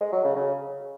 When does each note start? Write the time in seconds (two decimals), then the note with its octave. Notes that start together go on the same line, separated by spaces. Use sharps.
0.01 G#3
0.12 F#3
0.24 C#3
0.36 C#3